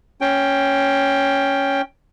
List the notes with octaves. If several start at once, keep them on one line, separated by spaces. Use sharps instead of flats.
C#4 G5